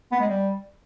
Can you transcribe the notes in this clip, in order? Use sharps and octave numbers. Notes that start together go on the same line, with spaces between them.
B3
G#3
G3